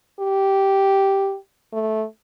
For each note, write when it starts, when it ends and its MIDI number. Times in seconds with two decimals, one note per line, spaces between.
0.20 1.36 67
1.73 2.05 57